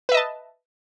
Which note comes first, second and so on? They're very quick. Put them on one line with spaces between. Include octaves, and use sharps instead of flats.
B4 E5 D#5 A5